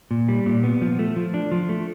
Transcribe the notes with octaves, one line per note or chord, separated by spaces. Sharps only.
A#2
G3
A#2
B3
F3
A3
F3
D4
F3
A3